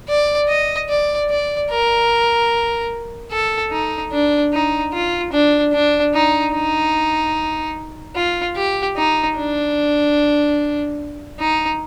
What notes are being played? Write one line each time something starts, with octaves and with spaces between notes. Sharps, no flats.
D5
D#5
D5
D5
A#4
A4
D#4
D4
D#4
F4
D4
D4
D#4
D#4
F4
G4
D#4
D4
D#4